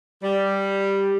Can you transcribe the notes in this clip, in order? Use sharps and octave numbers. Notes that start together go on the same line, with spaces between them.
G3